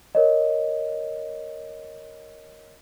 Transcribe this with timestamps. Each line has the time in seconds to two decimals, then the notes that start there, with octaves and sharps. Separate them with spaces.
0.15 A#4 C#5 D#5